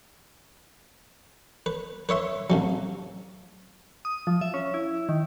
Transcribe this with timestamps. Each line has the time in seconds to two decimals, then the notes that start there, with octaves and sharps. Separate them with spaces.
1.66 B4
2.09 B4 C#5 E5 C6
2.50 A1 C3 F#3
4.05 D#6
4.27 F3
4.41 E5
4.54 C#4
4.74 E4
5.09 D#3